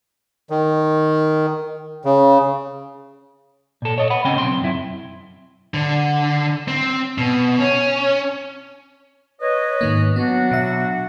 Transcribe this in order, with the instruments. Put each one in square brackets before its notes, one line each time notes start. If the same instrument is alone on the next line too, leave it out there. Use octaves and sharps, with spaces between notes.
[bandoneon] D#3
C#3
[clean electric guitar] A#2 A4
C#5 D#5
F#5 B5
C#3 C4 C#4 D#5 G5
B1 C4 C6
F#2 E4
[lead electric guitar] D3
C4
B2
C#4
[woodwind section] B4 C#5 D#5
[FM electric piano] G#2 D#3 A#3
[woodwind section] F#3 D4 F#4 [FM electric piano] B3
[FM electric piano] B2 E5